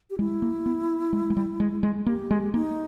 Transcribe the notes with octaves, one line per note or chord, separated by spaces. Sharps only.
G4
G#3 E4
A#3
B3
G#3
G#3
G3
G#3
G#3
A#3 G4
G#3
A#3 D#4